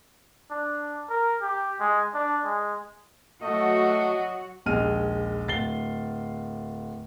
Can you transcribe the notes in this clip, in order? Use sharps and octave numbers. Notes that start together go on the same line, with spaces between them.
D4
A#4
G4
G#3
D4
G#3
F#3 A3 F#4 D#5
A#1 D#2 G#3 F6 D#7
D1 A6 C7 G7